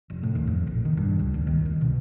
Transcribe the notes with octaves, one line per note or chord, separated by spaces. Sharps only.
F1
A2
D#2
F2
A#1
D#3
G2
C#2
D#2
D#3
C2
B2